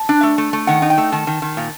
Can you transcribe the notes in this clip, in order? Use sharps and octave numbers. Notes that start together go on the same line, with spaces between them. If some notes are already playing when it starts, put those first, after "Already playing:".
Already playing: A5
D4
A3
A3
A3
D#3 F#5
D#4
G5
A3
D#3 A5
D#3
D#3
A#2